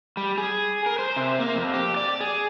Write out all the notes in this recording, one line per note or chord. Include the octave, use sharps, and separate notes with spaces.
G3
G#4
A#4
C5
C3
A#3
F2
G4
D5
G#4